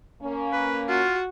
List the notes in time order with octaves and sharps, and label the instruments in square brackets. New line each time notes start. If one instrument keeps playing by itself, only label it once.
[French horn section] A#3 C#4
[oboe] B4
[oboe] F4 [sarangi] F#4